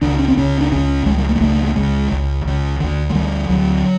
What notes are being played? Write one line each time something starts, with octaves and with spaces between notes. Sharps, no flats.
C#2 C#3 D4
C#4
C4
C#2 C#3 C#4
D4
C#2 C#3 C#4
C#2 C#3 G#3
G3
A3
G#3
C#2 C#3 A3
A3
C#2 C#3 G#3
C#2 C#3
C#2 C#3
D2 D3
G#3
D2 D3 G3
D2 D3 F#3